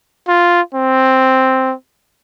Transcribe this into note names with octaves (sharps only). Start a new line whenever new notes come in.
F4
C4